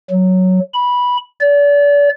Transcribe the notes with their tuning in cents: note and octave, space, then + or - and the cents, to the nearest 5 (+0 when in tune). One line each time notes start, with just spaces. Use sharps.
F#3 +0
B5 -10
D5 -35